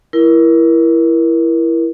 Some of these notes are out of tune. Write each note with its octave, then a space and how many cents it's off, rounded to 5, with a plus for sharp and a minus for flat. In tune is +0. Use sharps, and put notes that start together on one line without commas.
E4 +15 A#4 +25